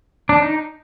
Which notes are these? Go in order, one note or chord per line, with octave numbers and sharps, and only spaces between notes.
D4
D#4